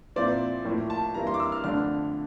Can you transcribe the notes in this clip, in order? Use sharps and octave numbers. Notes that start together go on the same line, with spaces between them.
A#2 F3 C4 E4 D5
A2 F3 A#3 E4
A5
G2 E3 G3 A#3 E4 A#5
C6
D6
E6
F6
F2 D3 A3 D4 F6